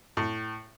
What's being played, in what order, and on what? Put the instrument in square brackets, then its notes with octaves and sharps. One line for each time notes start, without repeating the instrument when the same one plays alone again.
[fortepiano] A2